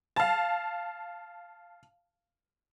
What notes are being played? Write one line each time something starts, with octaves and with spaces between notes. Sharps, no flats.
F5 A5